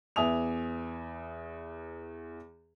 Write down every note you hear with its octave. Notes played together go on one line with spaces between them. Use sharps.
E2 B3 E5 G#5 D#6 F7